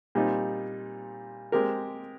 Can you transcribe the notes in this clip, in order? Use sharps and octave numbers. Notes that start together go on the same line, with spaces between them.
A#2 G3 C4 D#4
G#3 C4 G4 A#4